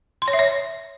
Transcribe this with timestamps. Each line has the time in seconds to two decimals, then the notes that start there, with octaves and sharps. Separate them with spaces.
0.22 C6
0.28 C#5
0.33 E5
0.39 C#5